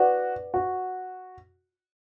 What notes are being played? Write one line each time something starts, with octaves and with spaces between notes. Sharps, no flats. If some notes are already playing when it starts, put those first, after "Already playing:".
Already playing: F#4 B4 D5 F#5
F#4